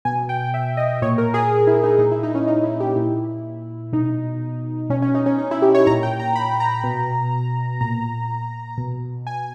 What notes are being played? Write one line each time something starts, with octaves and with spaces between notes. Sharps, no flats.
B2 G#5
G5
E5
D#5
A#2 C#5
A#4
G#4
E4
D#4
A#2 D#4
E4
D#4
C#4
D#4
E4
G4
A#2 E4
B2 D#4
B2 C#4
C#4
D#4
C#4
D#4
E4
G4
C#5
A#2 A#5
G5
A#5
B5
A#5
B2
A#2 A#5
B2
G#5